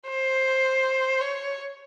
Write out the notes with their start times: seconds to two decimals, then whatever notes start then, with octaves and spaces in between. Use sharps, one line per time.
0.09 C5
1.21 C#5